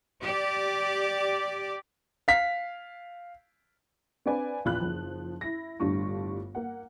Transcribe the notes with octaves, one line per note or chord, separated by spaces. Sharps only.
G4 D5
F5 B6
C4 D4 B4 D5 F5 G#5
A#1 E2 F4 B5 F#6
F#1 F3
E4 A#6
G1 A2 G3 D4 F4 C#6
A#3 F#5